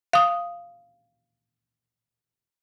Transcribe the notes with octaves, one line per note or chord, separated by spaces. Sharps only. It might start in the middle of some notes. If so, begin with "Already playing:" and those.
F5 D#6